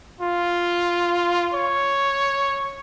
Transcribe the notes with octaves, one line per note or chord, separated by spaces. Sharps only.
F4
C#5